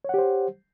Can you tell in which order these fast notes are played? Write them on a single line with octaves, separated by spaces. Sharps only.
C#5 F#5 G4 C5